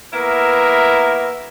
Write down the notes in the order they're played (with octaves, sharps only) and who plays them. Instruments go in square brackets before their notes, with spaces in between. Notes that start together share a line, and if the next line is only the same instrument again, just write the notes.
[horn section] A#3 B3 E4 A#4 E5